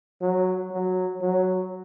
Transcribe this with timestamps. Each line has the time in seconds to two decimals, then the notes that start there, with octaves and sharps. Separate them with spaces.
0.21 F#3
0.71 F#3
1.21 F#3